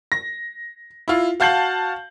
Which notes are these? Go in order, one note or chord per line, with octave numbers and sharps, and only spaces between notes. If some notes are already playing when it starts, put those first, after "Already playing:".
A#6
E4 F4
F#4 F5 A5 G6 C7 F#7